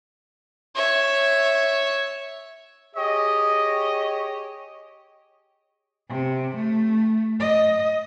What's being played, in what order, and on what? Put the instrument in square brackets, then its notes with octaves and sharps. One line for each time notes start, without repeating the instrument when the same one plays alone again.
[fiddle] C#5 E5
[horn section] G4 G#4 C#5 D#5
[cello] C3
A3
D#5